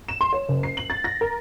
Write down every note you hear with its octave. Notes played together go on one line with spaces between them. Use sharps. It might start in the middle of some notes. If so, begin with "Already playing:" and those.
E7
C6
C#5
F#1
C7
F#7
A6
A#6
A#4